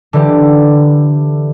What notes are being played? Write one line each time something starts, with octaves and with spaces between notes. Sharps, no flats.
D3 E3 G4